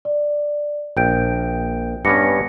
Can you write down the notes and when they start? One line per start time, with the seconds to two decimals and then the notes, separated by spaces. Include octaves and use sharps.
0.05 D5
0.97 A#1 G5 G6 D7
2.05 G2 B3 C#4 D6 A#6 C#7